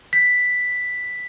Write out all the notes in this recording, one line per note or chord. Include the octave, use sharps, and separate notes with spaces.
B6